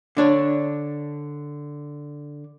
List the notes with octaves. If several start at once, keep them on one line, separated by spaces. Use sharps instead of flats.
D3 D4 C#5